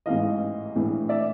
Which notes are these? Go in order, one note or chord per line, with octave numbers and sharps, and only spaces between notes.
A1 G#2 E3 D#5 F5
A#1 A2 E3
D5 E5